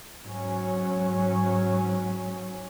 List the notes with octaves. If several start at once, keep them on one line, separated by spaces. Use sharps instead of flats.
G#2 F#3 C#4